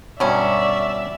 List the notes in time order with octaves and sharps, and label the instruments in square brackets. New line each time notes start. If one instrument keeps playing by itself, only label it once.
[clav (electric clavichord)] G2 B2 [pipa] F#3 C#4 [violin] D5 E5